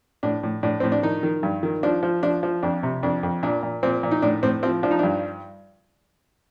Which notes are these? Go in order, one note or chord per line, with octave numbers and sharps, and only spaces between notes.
A2 D4
A2
A2 D4
A2 C4
D4
D#3 D#4
D#3
G2
D#3
F3 D4
F3
F3 D4
F3
F2 D4
C3
F2 D4
F2
A#2 D4
A#2
A#2 C4
A#2
D#4
A2 D4
A2 C4
F3 C4
F3 D4
D#4
G2 D4